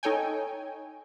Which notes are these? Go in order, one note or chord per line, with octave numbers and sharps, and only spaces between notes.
D#4 A4 C#5 G5 G#5